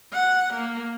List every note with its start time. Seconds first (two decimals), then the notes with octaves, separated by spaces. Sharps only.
0.13 F#5
0.53 A#3